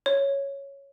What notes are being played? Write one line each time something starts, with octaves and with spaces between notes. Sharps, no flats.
C#5